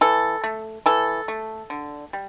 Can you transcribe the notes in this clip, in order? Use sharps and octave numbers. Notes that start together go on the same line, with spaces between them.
E3 A4
A3
E3 A4
A3
D3
G3